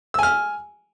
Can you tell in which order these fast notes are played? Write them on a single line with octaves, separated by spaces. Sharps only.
E6 G#5 F6